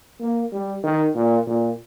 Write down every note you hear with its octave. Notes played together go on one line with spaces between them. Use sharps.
A#3
G3
D#3
A#2
A#2